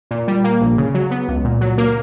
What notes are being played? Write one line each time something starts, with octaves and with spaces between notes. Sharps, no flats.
A#2
G3
A#3
A#1
C#3
F#3
B3
C#2
A#2
F#3
A#3